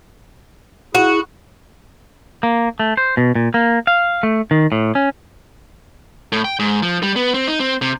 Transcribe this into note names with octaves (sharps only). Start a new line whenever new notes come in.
E4 F#4 G#4
A#3
A3
C5
B2
A#2
A#3
F5
A3
D#3
A2
C#4
A2
G5
G#2
F3
G3
B3
C4
D#4
C4
C3